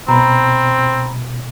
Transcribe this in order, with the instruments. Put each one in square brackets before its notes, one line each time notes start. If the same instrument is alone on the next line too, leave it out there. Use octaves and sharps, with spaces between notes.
[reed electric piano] B2 [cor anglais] C4 [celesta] A#5 B5